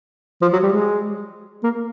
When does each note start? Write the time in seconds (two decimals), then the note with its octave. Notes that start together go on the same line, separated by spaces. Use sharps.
0.42 F3
0.53 F#3
0.63 G3
0.73 G#3
1.63 A#3